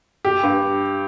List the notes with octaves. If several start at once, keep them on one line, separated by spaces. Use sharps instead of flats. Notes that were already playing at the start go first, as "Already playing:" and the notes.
G4
G2